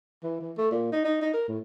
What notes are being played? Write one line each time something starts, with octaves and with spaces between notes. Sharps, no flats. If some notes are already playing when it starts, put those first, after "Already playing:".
E3
E3
A3
A#2
D#4
D#4
D#4
A#4
A2